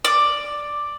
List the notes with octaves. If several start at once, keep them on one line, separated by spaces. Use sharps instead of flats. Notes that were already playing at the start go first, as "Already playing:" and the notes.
D5